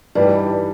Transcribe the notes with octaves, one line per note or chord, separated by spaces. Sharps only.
G2 E3 G3 D#4